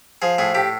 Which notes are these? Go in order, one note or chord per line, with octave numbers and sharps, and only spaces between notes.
F3 G#4
A2 G#4
A2 G4